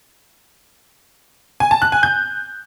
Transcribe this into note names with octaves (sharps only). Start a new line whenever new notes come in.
G#5
A5
F#6
G#5
G6